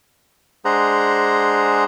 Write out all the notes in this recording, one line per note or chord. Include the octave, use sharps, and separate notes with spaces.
G#3 D4 G#4 C5 F#5 A#5